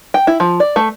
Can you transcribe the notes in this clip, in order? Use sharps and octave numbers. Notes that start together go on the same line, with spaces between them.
G5
E4
F3
D5
A3